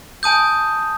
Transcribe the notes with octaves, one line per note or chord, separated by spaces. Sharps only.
G#5 A5 D#6 G6